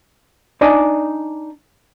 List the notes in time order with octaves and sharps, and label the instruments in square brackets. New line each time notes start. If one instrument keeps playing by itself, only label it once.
[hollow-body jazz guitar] D4 D#4 D5 D#5 G#5